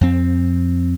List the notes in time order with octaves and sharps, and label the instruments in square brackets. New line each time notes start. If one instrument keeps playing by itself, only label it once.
[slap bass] F2 C4